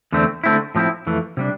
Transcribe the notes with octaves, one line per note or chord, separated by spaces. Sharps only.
E2 D3 A3 C4
D3 A3 C4 E4
A2 F3 C4 E4
F2 E3 A3
C3 G3 D4